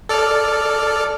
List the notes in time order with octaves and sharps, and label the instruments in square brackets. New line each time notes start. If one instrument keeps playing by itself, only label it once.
[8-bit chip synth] A4 D5 F6